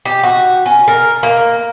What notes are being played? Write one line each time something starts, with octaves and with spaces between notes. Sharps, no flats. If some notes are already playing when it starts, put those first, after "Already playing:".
G4
F#4
C#4
A#4
A#3